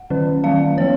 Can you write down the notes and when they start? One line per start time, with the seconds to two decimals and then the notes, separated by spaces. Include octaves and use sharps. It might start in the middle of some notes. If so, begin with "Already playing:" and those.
Already playing: F#5
0.10 D#3 F#3 C#4
0.44 D#3 F#3 C#4 F5
0.77 F3 B3 C#5